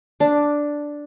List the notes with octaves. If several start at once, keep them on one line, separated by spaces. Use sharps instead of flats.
D4